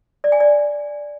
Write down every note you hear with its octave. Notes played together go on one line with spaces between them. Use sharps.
D5
G#5
D5